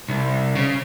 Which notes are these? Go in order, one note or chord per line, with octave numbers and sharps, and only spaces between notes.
C2
C#3